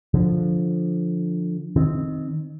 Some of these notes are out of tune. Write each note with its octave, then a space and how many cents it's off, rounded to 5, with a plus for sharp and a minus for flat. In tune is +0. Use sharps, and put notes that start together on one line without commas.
D3 +0 F3 +0
D#3 +0 C4 +0